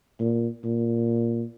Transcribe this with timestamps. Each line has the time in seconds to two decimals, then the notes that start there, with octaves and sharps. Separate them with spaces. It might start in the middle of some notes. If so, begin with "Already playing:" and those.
0.19 A#2
0.64 A#2